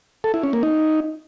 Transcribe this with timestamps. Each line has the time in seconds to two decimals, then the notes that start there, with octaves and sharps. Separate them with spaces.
0.24 A4
0.34 E4
0.43 C#4
0.53 A#3
0.63 D#4